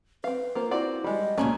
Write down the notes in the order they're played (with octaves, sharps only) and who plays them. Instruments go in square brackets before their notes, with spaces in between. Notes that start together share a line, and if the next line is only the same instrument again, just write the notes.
[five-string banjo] C4 F5 [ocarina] B4
[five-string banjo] A#3 F4 C5
[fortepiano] C4 F#4 D5 [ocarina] E4
[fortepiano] G3 [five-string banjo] G#3 B5 [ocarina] D#5
[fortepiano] C#2 G#5 A#5 [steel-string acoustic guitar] F#2 A#2 D3 [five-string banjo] A3 C#4